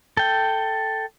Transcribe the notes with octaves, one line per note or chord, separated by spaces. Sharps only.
A4 G5